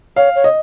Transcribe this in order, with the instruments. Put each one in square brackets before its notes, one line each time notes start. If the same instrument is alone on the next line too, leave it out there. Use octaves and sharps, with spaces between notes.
[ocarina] C#5 [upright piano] F5
[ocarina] C#5
[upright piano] D#5